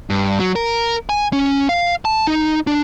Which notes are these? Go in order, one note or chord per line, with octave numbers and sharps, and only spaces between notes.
G2
F#3
A#4
G#5
C#4
F5
A5
D#4
D4